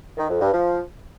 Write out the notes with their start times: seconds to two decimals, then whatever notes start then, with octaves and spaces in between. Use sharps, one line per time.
0.18 D#3
0.29 F2
0.41 G2
0.52 F3